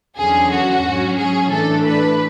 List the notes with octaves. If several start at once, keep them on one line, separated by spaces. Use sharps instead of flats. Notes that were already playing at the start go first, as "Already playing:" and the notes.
E2 D3 F#3 C#4 G#4
F#4
G#2 F#3 C#4
G#4
A2 E3 A3 D4 A4
B4